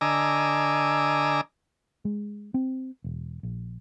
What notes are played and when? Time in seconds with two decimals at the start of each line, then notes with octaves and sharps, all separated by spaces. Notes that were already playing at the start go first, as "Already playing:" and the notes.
0.01 D3 D#5 G#5 A#5 D6 E6
2.05 G#3
2.54 C4
3.04 E1
3.43 A#1